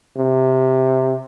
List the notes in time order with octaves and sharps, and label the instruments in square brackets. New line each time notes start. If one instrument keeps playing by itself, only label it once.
[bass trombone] C3